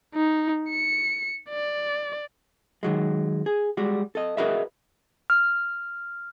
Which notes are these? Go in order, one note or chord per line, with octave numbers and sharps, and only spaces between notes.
D#4
C#7
D5
D#3 F#3 G#3
G#4
G3 G#3 F#4
A4 D#5
F#4 G#4 A#4 B4 D#5 E5
F6